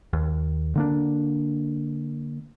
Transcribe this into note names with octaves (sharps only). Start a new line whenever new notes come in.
D#2
D3 A#3 D4